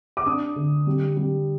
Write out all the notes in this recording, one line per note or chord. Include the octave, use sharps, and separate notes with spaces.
D6
D4 D#6
D3
G3
G3